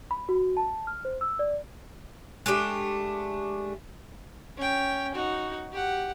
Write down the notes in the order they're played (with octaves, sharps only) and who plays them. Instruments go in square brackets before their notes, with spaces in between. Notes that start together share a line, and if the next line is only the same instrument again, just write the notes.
[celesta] B5
F#4
A5
F6
C5
E6
D5
[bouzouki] G#3 A3 D4 G4
[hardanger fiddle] C#4 G5
D#4 F#4
G4 F#5